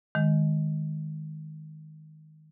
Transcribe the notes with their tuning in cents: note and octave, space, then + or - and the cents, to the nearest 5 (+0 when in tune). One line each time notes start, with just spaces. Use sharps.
D#3 +0 G#3 +0